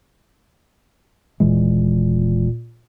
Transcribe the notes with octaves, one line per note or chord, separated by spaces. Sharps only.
D#1 A#2 E3 G#3